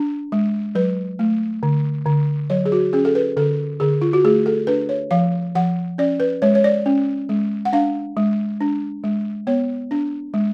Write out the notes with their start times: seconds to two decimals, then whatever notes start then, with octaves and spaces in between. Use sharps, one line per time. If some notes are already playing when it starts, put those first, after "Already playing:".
Already playing: D4
0.32 G#3
0.75 F#3 B4
1.19 A3
1.63 D3
2.06 D3
2.50 F#3 C#5
2.66 G#4
2.72 F#4
2.93 C#4 G#4
3.05 A4
3.15 B4
3.37 D3 A4
3.80 D3 G#4
4.02 F4
4.13 F#4
4.24 A3 G#4
4.46 A4
4.67 D4 B4
4.89 C#5
5.11 F3 F5
5.55 F3 F#5
5.98 C#4 D5
6.20 B4
6.42 G#3 C#5
6.55 C#5
6.64 D5
6.86 C#4
7.29 G#3
7.65 F#5
7.73 D4 F5
8.17 G#3
8.61 D4
9.04 G#3
9.47 B3 C#5
9.91 D4
10.34 G#3